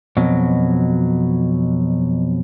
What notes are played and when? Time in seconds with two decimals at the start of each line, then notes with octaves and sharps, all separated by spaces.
0.17 F2 B2 F#3